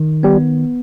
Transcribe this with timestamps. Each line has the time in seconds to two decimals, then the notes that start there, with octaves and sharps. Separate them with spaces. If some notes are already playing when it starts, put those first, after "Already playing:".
Already playing: D#3
0.23 G3 B3